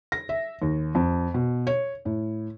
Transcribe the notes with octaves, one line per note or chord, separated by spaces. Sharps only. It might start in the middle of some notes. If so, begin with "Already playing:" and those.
A#6
E5
D#2
F2
B2
C#5
A2